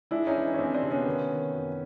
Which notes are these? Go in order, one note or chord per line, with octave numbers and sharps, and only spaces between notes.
G#3 D4 E4
C#4 D#4
E3
C#4
G#3 C4 D4
C4 D4
C3
B3 C#4
D#3
D#3
F#2